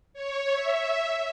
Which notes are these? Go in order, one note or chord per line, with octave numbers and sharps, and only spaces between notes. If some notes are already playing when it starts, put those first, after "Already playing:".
C#5
E5